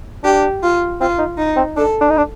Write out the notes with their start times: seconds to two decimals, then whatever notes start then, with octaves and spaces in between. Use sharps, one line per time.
0.23 D4 G4
0.62 F4
1.00 C4 F4
1.18 D#4
1.38 D#4
1.56 C4
1.76 D4 A4
2.01 D4
2.10 D#4
2.17 D4